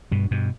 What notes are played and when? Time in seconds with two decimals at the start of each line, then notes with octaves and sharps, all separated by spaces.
0.11 G2 B2
0.31 G2 B2